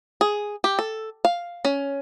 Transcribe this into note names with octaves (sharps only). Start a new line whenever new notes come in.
G#4
G4
A4
F5
C#4